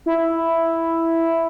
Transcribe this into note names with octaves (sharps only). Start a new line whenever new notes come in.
E4